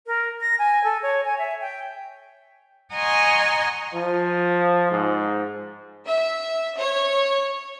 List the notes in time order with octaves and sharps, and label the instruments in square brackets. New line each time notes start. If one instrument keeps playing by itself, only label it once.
[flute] A#4
A#6
G#5
A4
C#5
G#5
E5
G5
[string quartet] D#5 F#5 G#5 A#5 C6 C#6
[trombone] F3
G#2
[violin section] E5
C#5